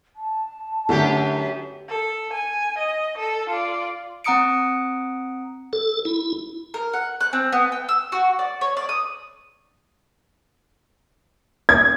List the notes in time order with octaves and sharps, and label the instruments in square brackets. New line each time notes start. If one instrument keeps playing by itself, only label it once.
[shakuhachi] A5
[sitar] F#2 B3 G4 [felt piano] D3 A3 E4
[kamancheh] A4
G#5
D#5
A4
F4 D5
[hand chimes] C4 F#5 A#5 D#6 C#7 D7
[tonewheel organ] A4
E4
[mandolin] A#4
F#5
F#6
C4
B3
G5
E6
F#4
D5
C#5
D5
D#6
[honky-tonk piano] G#6